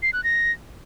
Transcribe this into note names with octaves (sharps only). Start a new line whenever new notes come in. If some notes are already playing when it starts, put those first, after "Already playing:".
C7
F#6
A#6